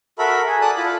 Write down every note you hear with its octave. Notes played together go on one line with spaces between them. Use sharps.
F#4 A4 A#4 E5 B5
G#4
A4 D5 A5 D#6 F#6
E4 F4 B5